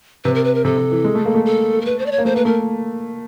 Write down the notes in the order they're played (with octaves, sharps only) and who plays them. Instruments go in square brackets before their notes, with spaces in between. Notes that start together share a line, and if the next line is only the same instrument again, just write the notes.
[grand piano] C3 [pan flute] B4
[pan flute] A#4
B4
A#4
[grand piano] C3 [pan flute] A4
[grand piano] C3
E3
G#3
A3
A#3
A3
[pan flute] A4
A#4
B4
C5
D5
C#5
[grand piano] A#3
[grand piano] A3 [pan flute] C5
[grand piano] A#3 [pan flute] B4
[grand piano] A3 [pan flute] A#4